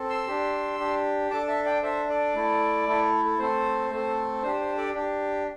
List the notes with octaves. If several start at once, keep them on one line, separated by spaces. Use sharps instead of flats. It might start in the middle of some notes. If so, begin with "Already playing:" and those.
Already playing: C4 A4
C6 E6
D4 G4
D4 G4
D4 A4 A5 D6
E5 A5
D5 G5
D4 A4 C5 E5
A4 D5
A3 E4 A4
A3 E4 A4
A4
A3 C4 A4 C5
A3 C4 A4
D4 G4 C5
C5
A4 D5
D4 G4